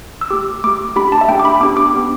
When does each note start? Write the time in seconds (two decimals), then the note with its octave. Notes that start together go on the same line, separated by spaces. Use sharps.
0.21 E6
0.30 A3 G4 D6
0.64 A3 G4 D6
0.96 A3 D4 G4 B5
1.12 A5
1.21 E5
1.28 A3 D4 G4 G5
1.39 D6
1.45 B5
1.60 B3 D4 G4 D6
1.77 D6
1.94 B3 D4 G4